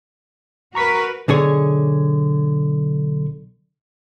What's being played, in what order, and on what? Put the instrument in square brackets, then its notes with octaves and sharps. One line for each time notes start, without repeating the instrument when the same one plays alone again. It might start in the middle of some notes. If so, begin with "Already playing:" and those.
[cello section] F#4 A#4 B4 [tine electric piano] A#5 C#6 B6
[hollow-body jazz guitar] B1 D3 G#4 C#5